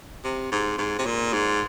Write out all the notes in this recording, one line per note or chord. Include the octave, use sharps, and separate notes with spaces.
C3
G#2
G#2
C3
A#2
G#2